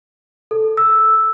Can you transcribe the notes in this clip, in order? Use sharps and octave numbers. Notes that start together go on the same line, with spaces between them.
A4
E6